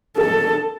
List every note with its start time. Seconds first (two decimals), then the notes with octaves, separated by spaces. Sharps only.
0.17 A4